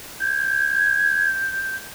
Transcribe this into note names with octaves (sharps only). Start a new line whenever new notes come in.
G6 G#6